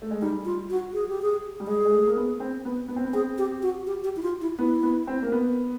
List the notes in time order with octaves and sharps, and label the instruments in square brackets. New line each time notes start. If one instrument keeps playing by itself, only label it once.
[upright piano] A3
G#3
[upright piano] G3 [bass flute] D#4
[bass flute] F4
F#4
G#4
G4
G#4
[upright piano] G3
[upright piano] G#3 [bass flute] G#4
[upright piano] G#3
A3
A#3
B3
C4
B3
B3
C4
B3
[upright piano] C4 [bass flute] G#4
[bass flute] G4
F#4
G4
G4
E4
F4
E4
[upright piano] B3 [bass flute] E4
[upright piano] B3
C4
A#3
B3